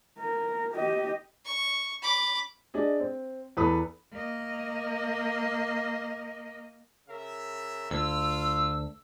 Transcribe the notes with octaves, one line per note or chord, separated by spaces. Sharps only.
A#4
G4 D#5
C#6
B5 D6
D4 G#4 D#5
C4
E2 A4 B4 A#5 D#6
A#3 D#5
C#3 A#4 E5
D2 F4 E6